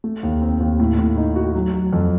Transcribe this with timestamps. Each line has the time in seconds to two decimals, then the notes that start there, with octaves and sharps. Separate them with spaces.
0.04 A3
0.23 D#2
0.42 C4
0.60 D#2
0.80 A2
0.98 A2
1.17 D#4
1.36 F#4
1.55 F#3
1.74 F#3
1.93 F2